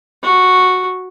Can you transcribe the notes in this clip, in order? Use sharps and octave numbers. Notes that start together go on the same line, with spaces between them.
F#4